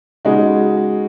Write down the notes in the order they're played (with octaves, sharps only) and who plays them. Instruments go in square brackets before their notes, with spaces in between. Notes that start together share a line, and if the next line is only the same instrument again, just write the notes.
[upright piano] C#3 G#3 D#4 F#4